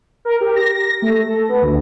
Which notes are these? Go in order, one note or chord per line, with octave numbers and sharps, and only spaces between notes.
A#4
G4
A#6
A#6
A3
A4
B3
D2